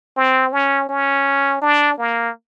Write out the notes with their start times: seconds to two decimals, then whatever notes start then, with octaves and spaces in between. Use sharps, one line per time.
0.17 C4
0.53 C#4
0.89 C#4
1.62 D4
1.98 A#3